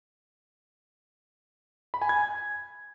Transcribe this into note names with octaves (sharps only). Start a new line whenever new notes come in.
B5
G#5
G#6